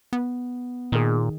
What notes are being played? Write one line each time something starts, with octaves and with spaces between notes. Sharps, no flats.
B3
A#2 D#3 G#4